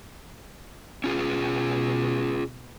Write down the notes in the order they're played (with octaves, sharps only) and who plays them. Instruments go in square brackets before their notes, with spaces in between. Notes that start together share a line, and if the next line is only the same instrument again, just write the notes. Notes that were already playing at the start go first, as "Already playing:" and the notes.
[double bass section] B2 [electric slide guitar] C#4 F4 G#4